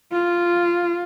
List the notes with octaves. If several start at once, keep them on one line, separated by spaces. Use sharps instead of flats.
F4